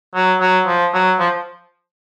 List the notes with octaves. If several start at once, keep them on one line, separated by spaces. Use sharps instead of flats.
F#3
F#3
F3
F#3
F3